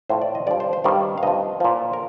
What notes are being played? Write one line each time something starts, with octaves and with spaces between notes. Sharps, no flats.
A2 F3 C5
D5
D#5
G2 F3 D5
C5
C5
G2 D#3 G3 D5
F5
G2 F3 D#5
A#2 F3
A#4